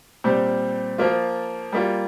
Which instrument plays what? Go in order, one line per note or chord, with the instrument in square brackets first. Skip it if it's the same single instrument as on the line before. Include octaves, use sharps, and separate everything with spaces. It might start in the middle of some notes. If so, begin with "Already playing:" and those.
[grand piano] A#2 G3 C4
F3 A#3 F4
G3 A#3 F4